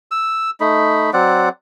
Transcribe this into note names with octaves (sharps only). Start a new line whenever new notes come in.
E6
A3 D#4 B5
F#3 C4 D5 F#5